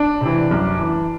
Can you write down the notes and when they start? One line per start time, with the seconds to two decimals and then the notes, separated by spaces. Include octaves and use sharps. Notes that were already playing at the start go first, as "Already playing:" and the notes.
Already playing: D4
0.21 C3 E3
0.51 F#2
0.80 E3